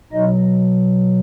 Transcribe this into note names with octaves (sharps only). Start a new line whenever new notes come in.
B2 F#3 D#4 D#5